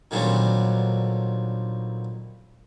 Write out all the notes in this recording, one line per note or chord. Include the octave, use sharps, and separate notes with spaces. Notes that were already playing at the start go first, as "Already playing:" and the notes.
A#2 D3 D#3 F#3 G3 C4